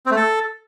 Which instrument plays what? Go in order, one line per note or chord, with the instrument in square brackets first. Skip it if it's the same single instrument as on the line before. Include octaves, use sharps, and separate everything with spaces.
[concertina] C4
A3
A4